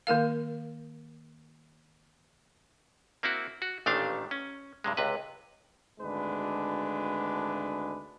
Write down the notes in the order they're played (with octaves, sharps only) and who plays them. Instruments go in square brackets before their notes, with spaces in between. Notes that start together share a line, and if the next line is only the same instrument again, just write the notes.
[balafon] D#3 A#3 A#4 F5
[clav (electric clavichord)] A#3 C4 E4 F#4
F#4
A1 A#2 D#3 A3 D4 F5
C#4
G2 C3 G#3
C#2 C3 B4
[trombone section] G#1 D2 G#3 D4 B4